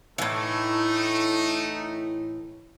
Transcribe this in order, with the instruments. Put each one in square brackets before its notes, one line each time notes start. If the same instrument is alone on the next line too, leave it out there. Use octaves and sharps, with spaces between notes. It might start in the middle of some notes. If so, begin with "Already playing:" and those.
[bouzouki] A2 E3 [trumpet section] A3 D#4